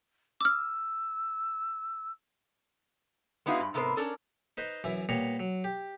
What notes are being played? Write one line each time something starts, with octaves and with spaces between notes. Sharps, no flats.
D6 E6 F6
G#3 B3 D#4 E4 F#4 F5
G2
G#2 C3 B3 A#4 C5
C#4 D4 A4 A#4
D#4 B4 C5 D#5
F#2 E3 E4
A#2 G3 B3 C#5 A#5
F#3
G4